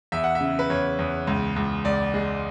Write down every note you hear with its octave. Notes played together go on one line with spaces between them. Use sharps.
E2 E5
F#5
E5
C#3
B4
E2 C#5
E2
C#2
C#2
C#2 D5
G#3